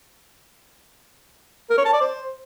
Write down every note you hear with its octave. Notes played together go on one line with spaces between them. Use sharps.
A#4
C#5
A5
D5
C5